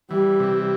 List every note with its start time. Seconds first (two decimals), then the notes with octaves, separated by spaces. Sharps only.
0.11 E3 G3
0.39 C3